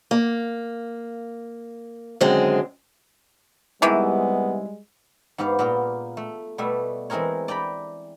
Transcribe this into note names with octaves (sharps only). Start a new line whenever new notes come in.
A#3
F#2 D3 D#3 G#3 C4
C3 D#3 E3 G3 G#3 B3
G#2 B3 G4 F5
A#2 A#3 B3 F4
A3
B2 G3 A3 E5
E3 G#3 C4 G#4 A#4 C#5
D5 G5 A#5 B5